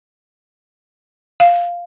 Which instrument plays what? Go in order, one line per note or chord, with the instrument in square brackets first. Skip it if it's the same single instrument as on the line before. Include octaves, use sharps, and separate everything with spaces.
[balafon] F5